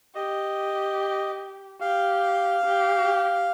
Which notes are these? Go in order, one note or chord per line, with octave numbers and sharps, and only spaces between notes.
G4 D#5
G4 F5
G4